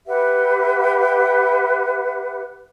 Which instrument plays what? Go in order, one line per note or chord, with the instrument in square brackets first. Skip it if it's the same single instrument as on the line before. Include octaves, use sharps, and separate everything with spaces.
[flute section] G4 B4 E5 F#5